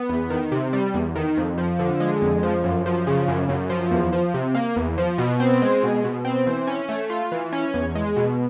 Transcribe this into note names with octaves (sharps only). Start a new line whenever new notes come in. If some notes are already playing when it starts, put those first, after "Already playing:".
Already playing: B3
E2
D#3
C3
G3
E2
D#3
F2
F3
D3
G#3
F2
F3
F#2
F3
C#3
F#2
F#2
F3
E2
F3
C3
A#3
E2
F3
B2
C4
G#3
B2
B2
C4
E3
C#4
A3
F4
E3
C#4
E2
G#3
B2